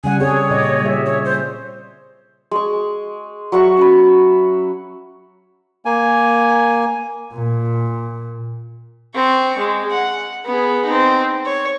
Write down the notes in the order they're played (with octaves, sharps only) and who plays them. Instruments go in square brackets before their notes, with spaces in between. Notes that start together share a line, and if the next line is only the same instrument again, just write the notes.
[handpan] C#3 G3 F#5 [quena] G#5
[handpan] C4 G#4 A4 [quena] C#5
[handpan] A#2 D5 D#5
G3 G#4 E5
[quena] C#5
C5
[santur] G#3 C#6
F#3 E5 F#5 C#6
C#4 F#5 B5
[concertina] A#3 G#5
[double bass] A#2
[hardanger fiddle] C4 C#6
G#3
F#5
B3 G#4
C4 D#4
C#5